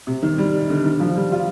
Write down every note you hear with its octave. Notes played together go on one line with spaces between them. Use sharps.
C3
D#3
G3
D3
D#3
F3
G3
F4